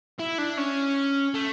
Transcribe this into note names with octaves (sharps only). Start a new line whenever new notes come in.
E4
D4
C#4
A3